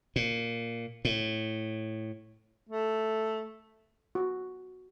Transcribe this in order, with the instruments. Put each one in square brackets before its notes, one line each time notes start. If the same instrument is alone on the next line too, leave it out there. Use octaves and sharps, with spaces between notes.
[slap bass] A#2
A2
[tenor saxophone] A3
[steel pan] F#4